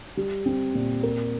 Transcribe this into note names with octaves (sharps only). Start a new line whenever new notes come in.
G3
C4
A#2
A#4